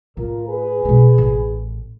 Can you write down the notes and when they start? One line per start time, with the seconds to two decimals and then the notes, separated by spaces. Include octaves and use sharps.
0.17 A2 F4 A#4
0.49 G#4 B4
0.85 B2 E4
1.18 A1